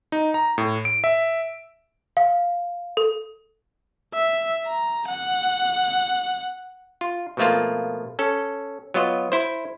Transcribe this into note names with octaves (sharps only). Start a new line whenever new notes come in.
D#4
A#5
A2
D7
E5
F5
A4
E5
A#5
F#5
F4
B2 F3 A3 A#3 F4
C#4 A4
F#3 B3 F4 D#5
E4 C5